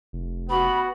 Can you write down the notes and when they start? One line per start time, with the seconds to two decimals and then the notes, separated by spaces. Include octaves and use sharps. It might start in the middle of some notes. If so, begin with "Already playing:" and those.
0.13 F1
0.50 B3 F#4 B5